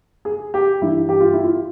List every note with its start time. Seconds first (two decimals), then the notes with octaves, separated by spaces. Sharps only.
0.25 G#4
0.54 G4
0.81 G2 E3 E4
1.09 G4
1.20 F4
1.33 E4
1.44 F4